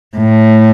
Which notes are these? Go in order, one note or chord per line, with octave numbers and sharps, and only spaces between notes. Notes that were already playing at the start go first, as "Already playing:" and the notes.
A2